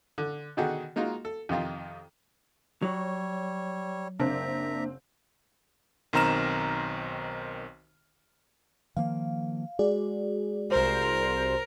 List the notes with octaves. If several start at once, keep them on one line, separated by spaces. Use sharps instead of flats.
D3
B2 D3 D#3 F#4 G#4 F#5
G#3 A#3 D#4 F4 F#4
A4
F2 C3 D#3 F4
F#3 G3 C#5
F#1 A#3 C4 D4 E5 A#5
B1 D#3 C4 A#5 F6 E7
D#3 F3 A#3 F5
G#3 F#4 G#4 D5
C2 A#4 C5